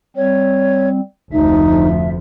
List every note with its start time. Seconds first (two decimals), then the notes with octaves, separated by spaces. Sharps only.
0.17 G3 C4 C#5
1.33 F1 D2 F3 D#4 E5